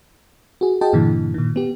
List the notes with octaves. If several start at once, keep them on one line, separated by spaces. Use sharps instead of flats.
F#4 G#4
F#4 G#4 D#5 G5 A5
G2 A#2 D3 E3
A#2 D#3
B3 G4